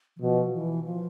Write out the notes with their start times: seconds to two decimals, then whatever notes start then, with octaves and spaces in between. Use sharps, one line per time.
0.17 E3
0.20 B2 F3
0.53 E3
0.85 F3